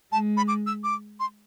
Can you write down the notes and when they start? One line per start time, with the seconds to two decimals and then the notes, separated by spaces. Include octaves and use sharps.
0.12 G#3 A5
0.37 B5
0.48 D6
0.67 E6
0.84 D6
1.20 C6